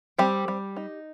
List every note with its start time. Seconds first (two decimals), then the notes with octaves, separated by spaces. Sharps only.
0.19 G3 C4 G4
0.48 G3
0.76 D#4